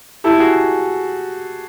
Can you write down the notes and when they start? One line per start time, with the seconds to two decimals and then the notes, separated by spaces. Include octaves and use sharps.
0.24 E4 G4 A4
0.39 F#4 G#4